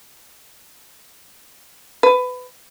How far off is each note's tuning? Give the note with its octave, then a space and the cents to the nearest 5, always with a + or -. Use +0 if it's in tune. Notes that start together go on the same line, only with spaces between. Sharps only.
B4 +20